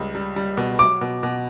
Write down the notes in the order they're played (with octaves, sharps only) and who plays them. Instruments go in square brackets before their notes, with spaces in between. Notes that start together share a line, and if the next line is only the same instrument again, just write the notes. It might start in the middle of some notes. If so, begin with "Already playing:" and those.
Already playing: [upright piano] C#2 G3
G3
G3
B2
[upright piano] F#3 [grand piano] D6
[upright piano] B2
B2